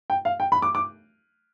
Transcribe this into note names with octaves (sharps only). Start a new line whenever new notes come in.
G5
F5
G5
B5
D6
D6